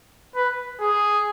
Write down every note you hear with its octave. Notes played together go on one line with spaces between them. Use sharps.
B4
G#4